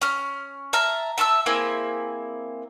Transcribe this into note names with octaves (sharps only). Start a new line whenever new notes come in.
C#4 F6
E5 A5 A#5 F6
E5 A5 C#6 E6
A#3 C4 E4 G#4